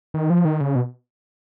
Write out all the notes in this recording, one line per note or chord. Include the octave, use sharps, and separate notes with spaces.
D#3
F3
D#3
C#3
B2